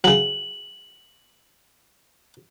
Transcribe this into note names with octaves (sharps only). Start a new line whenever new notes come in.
C#3 F#3 F#7